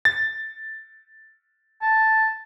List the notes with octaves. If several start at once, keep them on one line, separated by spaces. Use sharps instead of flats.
A6
A5